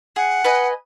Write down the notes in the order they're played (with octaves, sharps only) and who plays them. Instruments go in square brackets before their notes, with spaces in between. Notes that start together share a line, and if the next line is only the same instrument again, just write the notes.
[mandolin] G#4 [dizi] F#5
[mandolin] B4 D#5 G#5